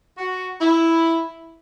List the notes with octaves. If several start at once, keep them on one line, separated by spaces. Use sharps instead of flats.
F#4
E4